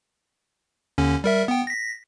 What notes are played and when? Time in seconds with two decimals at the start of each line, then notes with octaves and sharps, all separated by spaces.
0.98 D#2 D3 C#4
1.24 G3 A#4 E5
1.48 B3 G5
1.67 A#6 B6